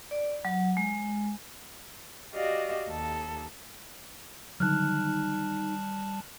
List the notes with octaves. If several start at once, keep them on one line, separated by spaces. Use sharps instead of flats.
D5
F#3
G#3
F#4 G4 D5 D#5 F5
D#2 A4
D3 D#3 F#3 G3 D#4 A5 F6 F#6